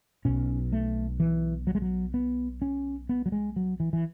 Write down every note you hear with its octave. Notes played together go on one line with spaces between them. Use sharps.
B1 B2 C#4
A3
E3
F#3
G#3
F#3
B3
C#4
B3
F#3
G#3
F#3
E3
E3